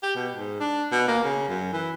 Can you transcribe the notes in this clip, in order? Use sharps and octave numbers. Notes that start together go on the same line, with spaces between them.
G4
B2
G#2
D4
B2
A#3
C#3
F#2
E3